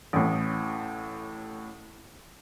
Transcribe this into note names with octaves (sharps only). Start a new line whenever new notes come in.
A1 A2